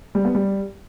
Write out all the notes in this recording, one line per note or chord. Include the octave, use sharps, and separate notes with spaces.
G3
B3
G3